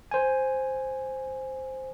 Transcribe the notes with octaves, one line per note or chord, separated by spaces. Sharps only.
C5 G#5